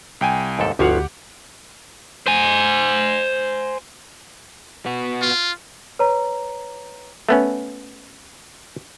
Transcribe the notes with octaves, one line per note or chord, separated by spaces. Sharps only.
C2 G5 G#5
D#2 G#2 A4
G1 D2 F3 E4 F#4 G4 F5 F#5
C5 G#5
B3 F#4
F4
B4 C#5 A#5
A3 B3 C#4